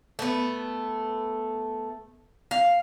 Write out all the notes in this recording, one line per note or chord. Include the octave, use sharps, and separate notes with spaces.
A3 B3
F5